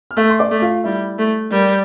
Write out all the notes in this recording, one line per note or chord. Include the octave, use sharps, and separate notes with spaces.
F6
A3 E5 E6
C6
D5 D6
A3
F4 F5
G3 E4 E5
A3
G3 A#4